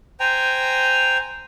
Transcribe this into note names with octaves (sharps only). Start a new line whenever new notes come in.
C5 G5 G#5 A#5